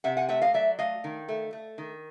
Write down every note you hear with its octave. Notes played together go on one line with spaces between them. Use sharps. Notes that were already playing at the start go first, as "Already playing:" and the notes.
C3 E5 F#5
F#5 G#5
A3 E5 F#5
D#5 F5
F#3 D5 E5
A3 D#5 F5
D#3
A3
A3
D#3